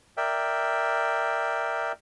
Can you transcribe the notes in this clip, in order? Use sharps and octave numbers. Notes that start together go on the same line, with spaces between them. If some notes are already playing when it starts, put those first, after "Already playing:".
A#4 D5 E5 G5